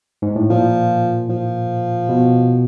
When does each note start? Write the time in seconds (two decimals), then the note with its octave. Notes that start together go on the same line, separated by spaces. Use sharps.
0.22 G#2
0.36 A2
0.50 A#2 F3
1.29 F3
2.09 B2